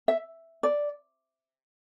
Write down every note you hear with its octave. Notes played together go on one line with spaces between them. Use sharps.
E5
D5